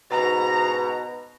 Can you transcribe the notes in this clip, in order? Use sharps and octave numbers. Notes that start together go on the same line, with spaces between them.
G#2 B2 A#5